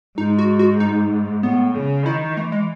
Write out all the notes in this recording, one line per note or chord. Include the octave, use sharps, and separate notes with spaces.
G#2 D#4
F#4
F#4
D#4
A2 B3
C#3
D#3 E4
E3 A3
G#3